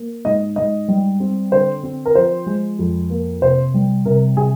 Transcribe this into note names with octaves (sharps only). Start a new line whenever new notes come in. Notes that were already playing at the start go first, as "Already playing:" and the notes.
Already playing: A#3
G#2 D#5
G#2 D#5
G3
C4
D3 C5
C4
A#4
F3 C5
G#3
F2
A#3
C3 C5
G3
C3 A#4
C3 G#4